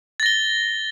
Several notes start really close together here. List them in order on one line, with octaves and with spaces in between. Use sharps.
A6 A#6 G7